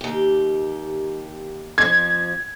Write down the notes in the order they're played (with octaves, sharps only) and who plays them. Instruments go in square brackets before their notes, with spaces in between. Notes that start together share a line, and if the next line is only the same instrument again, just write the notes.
[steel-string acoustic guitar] D#2 G4
[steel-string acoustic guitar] F2 F3 [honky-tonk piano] G#6